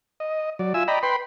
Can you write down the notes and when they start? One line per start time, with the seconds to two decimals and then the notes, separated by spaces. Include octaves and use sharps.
0.20 D#5
0.59 F#3 D5
0.74 F4 E5 G#5 E6
0.88 D5 D#5 G5 A#5 B5
1.03 B4 G5 B5 C6